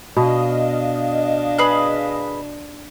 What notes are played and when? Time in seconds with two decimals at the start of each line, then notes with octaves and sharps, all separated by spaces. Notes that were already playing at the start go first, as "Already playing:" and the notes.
0.17 B2 D4 D#5 F5
1.58 G#4 B4 F#6